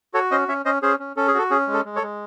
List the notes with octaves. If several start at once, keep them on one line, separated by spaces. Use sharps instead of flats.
F#4 A4 C#5
C#4 C5 D#5
C#4 C#5 E5
C#4 C5 D#5
C#4 G#4 C5
C#4
C#4 A4
G#4
F#4 A4
C#4 G#4
G#3
A4
G#3
A4 C#5
G#3